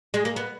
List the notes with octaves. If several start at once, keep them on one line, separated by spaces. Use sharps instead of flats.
G#3
A#3
B3